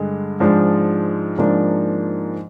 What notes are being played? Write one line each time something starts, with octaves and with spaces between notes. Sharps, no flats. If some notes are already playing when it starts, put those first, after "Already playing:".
Already playing: G2 D3 G#3
G#2 F3 G#3 D4
G#2 F3 A#3 D4